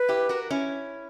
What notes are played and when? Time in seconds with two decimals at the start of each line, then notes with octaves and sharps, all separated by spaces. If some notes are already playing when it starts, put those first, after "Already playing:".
Already playing: B4
0.09 E4 G4
0.29 F#4 A#4
0.51 C#4 E4